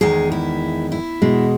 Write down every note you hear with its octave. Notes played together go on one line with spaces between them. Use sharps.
E2 D#3 G#3 G#4
E4
E4
E2 B2 G#3